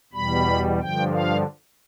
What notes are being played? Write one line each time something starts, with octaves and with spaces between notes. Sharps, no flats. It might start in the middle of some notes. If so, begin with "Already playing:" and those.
E2 B2 G3 B5
G2 D3 F3 G5
F5